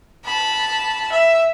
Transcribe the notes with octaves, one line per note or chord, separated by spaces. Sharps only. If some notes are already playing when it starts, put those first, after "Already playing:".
A5 B5
E5